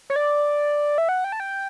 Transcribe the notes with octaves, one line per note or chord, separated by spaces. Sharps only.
C#5
D5
E5
F#5
G5
A5
G5